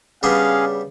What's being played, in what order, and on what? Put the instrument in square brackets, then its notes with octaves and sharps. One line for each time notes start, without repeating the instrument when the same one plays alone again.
[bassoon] C#3 [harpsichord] G3 B3 D4 [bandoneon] C#4 G#4 [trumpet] F5